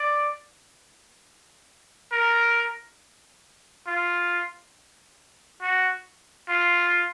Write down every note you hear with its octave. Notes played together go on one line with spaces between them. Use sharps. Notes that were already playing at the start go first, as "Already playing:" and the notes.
Already playing: D5
A#4
F4
F#4
F4